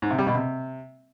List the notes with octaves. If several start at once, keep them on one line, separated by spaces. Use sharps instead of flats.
G#2
C3
G3
B2
C3